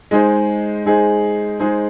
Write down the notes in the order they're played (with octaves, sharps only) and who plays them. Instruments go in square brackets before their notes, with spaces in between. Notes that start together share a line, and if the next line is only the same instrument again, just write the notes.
[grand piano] G#3 D#4 G#4 C5
G#3 D#4 G#4 C5
G#3 D#4 G#4 C5